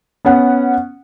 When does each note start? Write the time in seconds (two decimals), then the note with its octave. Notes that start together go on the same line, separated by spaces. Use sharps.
0.25 B3 C#4 F#5